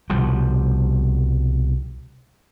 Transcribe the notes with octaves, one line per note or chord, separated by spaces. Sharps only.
C2 B2 F3 G3